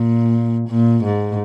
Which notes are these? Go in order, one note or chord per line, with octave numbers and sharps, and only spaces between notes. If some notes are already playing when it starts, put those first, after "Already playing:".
Already playing: A#2
A#2
G#2